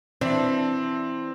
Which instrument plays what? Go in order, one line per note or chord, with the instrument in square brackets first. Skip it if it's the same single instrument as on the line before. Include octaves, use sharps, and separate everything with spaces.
[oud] E3 D4 [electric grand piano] C4